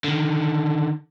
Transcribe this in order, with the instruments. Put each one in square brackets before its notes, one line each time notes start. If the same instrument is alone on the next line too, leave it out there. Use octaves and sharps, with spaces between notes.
[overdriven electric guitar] D3 D#3